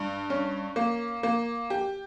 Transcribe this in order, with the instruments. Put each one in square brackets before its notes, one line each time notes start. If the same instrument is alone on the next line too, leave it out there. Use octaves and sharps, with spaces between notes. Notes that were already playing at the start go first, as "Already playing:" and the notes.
Already playing: [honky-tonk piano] G2
C#4
A#3
A#3
G4